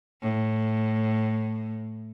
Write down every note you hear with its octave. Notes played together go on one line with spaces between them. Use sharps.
A2